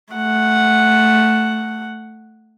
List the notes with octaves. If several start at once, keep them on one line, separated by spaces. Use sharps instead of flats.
A3 F#5